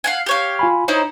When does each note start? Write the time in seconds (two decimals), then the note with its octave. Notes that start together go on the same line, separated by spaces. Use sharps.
0.04 F5 F#5 G#5
0.26 G4 C#5 F5
0.59 F4 G#5 B5
0.88 D#4 E4 C5 C#5